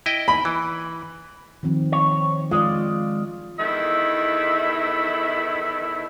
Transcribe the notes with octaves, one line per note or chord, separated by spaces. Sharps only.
E4 D#5 G5
B5
E3
D#3 F3 C4
C#5
G#3 F4 D5
E2 D#3 E4 A4 E5